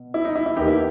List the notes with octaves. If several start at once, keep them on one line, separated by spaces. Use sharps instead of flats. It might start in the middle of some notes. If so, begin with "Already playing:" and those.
Already playing: B2
E4
D#4
E4
E4
E2 D#3 A#3 D#4 G4
E4